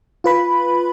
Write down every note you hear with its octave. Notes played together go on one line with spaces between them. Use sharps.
F4 B4 B5